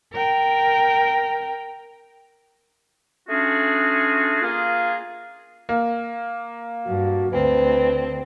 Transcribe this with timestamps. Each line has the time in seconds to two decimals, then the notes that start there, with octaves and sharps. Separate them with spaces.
0.13 A#4 G5
3.29 A3 C#4 D4 F4 F#4 G#4
4.42 A#3 F4 G#4
5.69 A#3
6.86 G2 F#4
7.32 D2 C4 B4